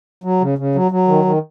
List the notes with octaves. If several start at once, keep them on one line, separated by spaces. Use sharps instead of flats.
F#3
C#3
C#3
F#3
F#3
D#3
D#3